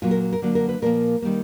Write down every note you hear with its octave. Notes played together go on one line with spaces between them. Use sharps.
A#2 F#3 A#3 F4
A#4
A#4
D3 F#3 A#3
A#4
B4
A#2 F3 A#3 A#4
D#3 G3 A#3